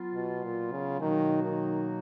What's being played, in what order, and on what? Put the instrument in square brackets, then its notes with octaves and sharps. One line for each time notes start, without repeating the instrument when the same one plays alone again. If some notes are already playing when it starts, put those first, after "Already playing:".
Already playing: [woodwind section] F#3 B3 F4
[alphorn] B2
A#2
C#3
[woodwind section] B2 F#3 A#3 D#4 F#4 [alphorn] D#3
[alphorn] D#3